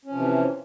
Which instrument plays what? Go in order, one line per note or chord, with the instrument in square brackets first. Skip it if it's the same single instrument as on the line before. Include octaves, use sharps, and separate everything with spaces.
[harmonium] C#4
F3
C3
E3